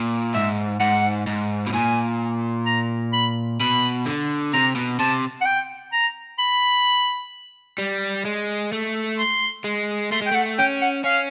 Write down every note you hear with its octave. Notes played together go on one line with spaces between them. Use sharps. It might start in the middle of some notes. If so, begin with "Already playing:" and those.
Already playing: A#2
G#2 E5
G#2 F#5
G#2
B2
A#2 G#5
A#5
B5
B2 B5
D3
C3 A#5
B2
C3 A5
F#5
G5
A#5
B5
G3
G#3
A3
C6
G#3
A3 C6
G#3
G5
A3 F#5
C#4 G5
F#5
C#4 F5